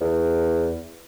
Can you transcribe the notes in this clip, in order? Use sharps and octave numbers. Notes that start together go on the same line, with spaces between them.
E2